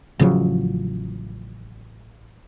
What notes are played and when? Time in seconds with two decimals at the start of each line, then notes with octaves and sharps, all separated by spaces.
0.20 A1 C#3 F3 F#3